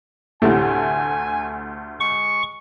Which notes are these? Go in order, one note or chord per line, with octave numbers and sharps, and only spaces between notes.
D2 A2 C3 A3 G#5
G#3 C#6